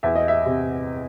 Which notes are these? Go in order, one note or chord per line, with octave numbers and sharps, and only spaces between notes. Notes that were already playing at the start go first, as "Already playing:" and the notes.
E2 E5
D#5
E5
C3